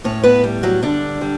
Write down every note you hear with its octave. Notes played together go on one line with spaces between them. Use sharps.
A2 C#4 C#5
B3 B4
G3
F#3 F#4
D3 G3 D4
G3